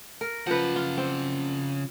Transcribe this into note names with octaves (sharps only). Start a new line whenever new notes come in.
A#4
C#3 F3 B4 F#5
F4
C4